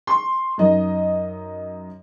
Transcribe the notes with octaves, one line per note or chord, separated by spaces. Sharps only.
C6 C#6
F#2 D#4 D#5